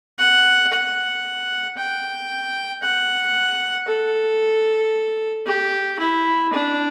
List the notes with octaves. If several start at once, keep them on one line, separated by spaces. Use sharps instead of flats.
F#5
F#5
G5
F#5
A4
G4
E4
D4